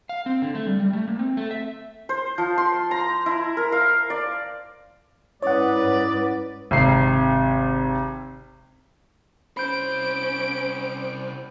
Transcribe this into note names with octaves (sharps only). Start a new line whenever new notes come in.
F5
C4
D3
A3
G3
G3
A3
A#3
C4
A3
E5
C5
F3
C6
A#5
E4
A#4
F5
D5
G#2 C#4 E4 B4 C#5 D5 F#5 D#6
G#1 C3 C7
C2 C#4 C5 B5 G6 D7